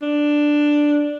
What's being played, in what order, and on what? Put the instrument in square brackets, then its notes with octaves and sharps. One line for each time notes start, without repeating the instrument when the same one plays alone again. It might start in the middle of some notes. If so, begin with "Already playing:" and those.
[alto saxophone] D4